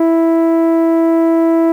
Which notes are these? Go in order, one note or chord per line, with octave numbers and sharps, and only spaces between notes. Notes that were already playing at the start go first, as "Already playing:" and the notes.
Already playing: E4